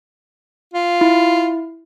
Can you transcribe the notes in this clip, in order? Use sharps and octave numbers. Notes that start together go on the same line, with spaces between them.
F4
E4